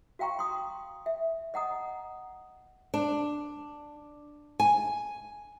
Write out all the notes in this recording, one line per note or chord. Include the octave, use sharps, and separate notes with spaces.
F#4 F5 G5 A#5 C#6
C6 D#6
E5
D#5 F#5 A#5 D#6
D4
G#5